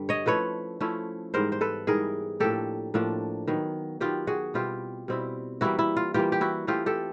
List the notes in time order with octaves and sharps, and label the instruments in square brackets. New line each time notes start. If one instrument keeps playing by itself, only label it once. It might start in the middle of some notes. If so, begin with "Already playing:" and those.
Already playing: [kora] G2 D3 G3
C#5 D#5
F3 A3 C#4 E4 B4 C#5
F3 A3 C#4 E4
G#2 E3 G3 B3 A#4 C5
C5
A4 B4
G#2 E3 G3 B3 G#4 A#4
A2 F3 A#3 D4 G4 A4
A2 F3 A#3 D4
D#3 F#3 B3
D#3 F#3 B3 F4 G4
F#4 G#4
B2 G3 C4 E4 F4 G4
B2 G3 C4 E4
E3 G3 A#3 E4 F#4
E4
F4
E3 G3 A#3 F4 G4
G4
E4 F#4
E3 A3 C4 E4 F4 G4
G4 A4